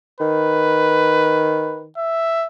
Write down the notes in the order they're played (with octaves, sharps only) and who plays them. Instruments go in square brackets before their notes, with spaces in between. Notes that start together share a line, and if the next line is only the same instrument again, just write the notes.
[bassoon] D#3 [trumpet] B4
[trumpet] E5